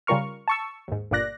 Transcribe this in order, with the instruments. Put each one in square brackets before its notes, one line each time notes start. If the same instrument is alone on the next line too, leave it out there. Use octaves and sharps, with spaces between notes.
[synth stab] C#3 G3 F4 A#4 C#6 F6
A5 C#6 E6
D#2 G#2
G1 G2 A#2 D5 F#6 A#6